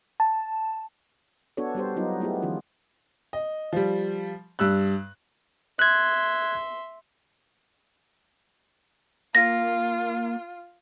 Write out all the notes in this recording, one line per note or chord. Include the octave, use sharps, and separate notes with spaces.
A5
B3 D4 F#4 A4 C#5
G3 B3 G4 C5
F#3 B3 D#4 F4
A3 B3 E4 G4 G#4
D#3 F3 C#4 F4
D#5
F3 G3
G2 G3 E6 F#6
E5 C6 F#6 G#6
A#3 F4 A#6